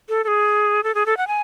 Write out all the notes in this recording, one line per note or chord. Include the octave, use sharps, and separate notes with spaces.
A4
A4
G#4
A4
G#4
A4
F#5
G#5